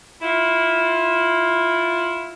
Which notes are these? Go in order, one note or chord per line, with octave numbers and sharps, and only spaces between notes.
E4 F4